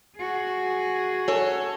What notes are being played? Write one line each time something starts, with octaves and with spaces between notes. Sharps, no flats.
F#4 G#4
C#4 A4 C#5